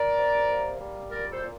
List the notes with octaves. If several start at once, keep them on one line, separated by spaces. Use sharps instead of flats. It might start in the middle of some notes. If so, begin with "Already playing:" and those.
Already playing: A#4 D5
C3
A#3
G3
A#2 A#4 D5
A4 C5
A#2